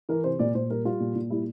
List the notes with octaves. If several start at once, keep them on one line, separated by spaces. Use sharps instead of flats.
E3 A#4
C3 C5
A#2 D5
A#2 C5
G3 A#4
G3 F4
A#2
A#2
G3 E4